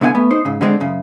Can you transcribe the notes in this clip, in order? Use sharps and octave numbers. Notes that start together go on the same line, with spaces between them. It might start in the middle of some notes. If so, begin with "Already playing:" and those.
C2 D3 B3 F5 G#5
A3 B3
D#4 C5
G#2 C#3
D3 G3 G#3 B3 C4 D4
F#2 C#3